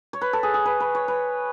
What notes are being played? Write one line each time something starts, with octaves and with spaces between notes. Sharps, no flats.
C#5
B4
A4
G#4
G#4
B4
B4
C#5
B4